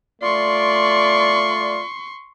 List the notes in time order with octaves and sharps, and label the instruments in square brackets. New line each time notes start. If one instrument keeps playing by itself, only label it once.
[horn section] A3 F4 D5 [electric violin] C6 C#6